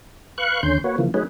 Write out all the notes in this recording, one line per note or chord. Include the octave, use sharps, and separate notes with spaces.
B4 F5 C#6 F#6
D#2 D3 C#4 C6 G6
A#3 F#4 B4 C#5
C#3 E3 F3 A#3
F#3 A3 C#4 D#4 G#4 B4